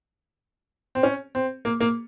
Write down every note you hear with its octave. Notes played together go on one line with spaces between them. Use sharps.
C4
C#4
C4
A#3
A#3